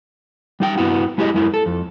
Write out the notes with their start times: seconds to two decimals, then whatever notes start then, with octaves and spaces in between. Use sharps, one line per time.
0.60 G3 D#4 G5
0.78 G2 B3 E4 F#4
1.18 G#3 E4 G4 G#4 D#5
1.34 F#2 G#3 E4 A#4
1.54 A4
1.66 F2